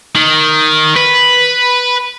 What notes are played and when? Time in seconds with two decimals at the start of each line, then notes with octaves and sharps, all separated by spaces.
0.16 D#3
0.96 B4